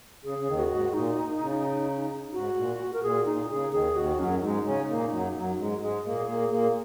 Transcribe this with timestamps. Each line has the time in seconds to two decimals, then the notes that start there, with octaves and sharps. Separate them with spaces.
0.24 C#3 G#4
0.38 C#3
0.47 D#2 D#3
0.59 F#4
0.70 G#2
0.94 A#2 D#4
1.41 C#3
2.33 G#2 F#4
2.56 A#2
2.93 A#4
3.03 A#2 G#4
3.26 A#2 D#4
3.49 C#3 G#4
3.72 D#2 D#3 G#4
3.96 D#2 D#3 F#4
4.19 F#2 F#3 C#4
4.42 G#2 G#3 D#4
4.65 C#3 C#4
4.89 A#2 A#3
5.11 F#2 F#3
5.35 F#2 F#3
5.58 G#2 G#3
5.81 G#2 G#3 G#4
6.05 A#2 A#3
6.28 A#2 A#3
6.51 A#2 A#3 G#4